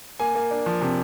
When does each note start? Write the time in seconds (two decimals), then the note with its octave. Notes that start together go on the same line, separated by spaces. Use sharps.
0.20 A#3 G#5
0.35 A#3
0.51 D4
0.66 F3
0.81 C3